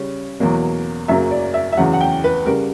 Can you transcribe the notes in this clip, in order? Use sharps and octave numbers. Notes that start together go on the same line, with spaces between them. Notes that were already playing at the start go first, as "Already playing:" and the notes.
Already playing: C#3 G3 C#4
E2 B2 F#3 A#3
F#2 C#3 F#3 A#3 E5
D5
E5
E5
E2 C#3 F#3 F#5
F#5
G5
B4
C#3 G3 A#4